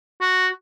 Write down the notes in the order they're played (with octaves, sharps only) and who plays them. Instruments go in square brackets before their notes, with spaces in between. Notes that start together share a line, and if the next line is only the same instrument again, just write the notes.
[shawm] F#4